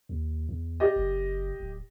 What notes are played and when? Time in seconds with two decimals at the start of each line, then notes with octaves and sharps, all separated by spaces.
0.09 D#2
0.49 E2
0.80 G4 D5 D#5
0.96 F#1
1.60 D1